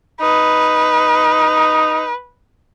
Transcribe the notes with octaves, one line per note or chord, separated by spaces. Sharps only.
D#4 B4